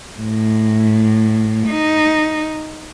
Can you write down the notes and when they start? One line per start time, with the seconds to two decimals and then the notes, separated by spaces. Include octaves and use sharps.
0.19 A2
1.69 D#4